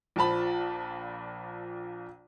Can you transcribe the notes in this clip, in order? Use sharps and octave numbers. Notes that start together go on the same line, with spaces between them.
A#1 A#2 F3 A5 B5